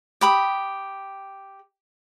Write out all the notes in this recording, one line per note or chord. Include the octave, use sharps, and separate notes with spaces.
G4 B5 D#6